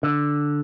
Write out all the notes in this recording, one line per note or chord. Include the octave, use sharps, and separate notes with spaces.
D3